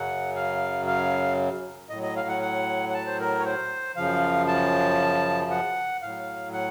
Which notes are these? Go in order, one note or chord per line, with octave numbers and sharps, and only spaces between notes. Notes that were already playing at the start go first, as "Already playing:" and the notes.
Already playing: F#2 C#3 F#3 F#5
F5
F5
A2 F#3 D#5
D#5
F5
F#5
F#5
F#5
A5
C5
A#4
C#5
C5
F#2 C#3 F3 F5
A5
F#5
A2 F#3 F5
F#5